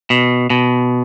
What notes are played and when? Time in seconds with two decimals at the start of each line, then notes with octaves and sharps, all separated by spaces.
0.10 B2
0.50 B2